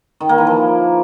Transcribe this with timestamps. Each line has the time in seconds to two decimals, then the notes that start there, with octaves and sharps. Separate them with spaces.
0.20 D#3
0.29 A#3
0.38 E3
0.47 F3